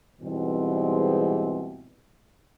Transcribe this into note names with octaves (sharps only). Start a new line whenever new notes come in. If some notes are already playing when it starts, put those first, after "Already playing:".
G#2 B2 E3 G3 G#3 C4